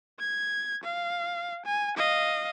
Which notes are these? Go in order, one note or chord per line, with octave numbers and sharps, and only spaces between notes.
G#6
F5
G#5
D#5 F5